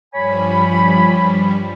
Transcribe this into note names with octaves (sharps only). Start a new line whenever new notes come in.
G2 F3 G3 C#5 G#5 B5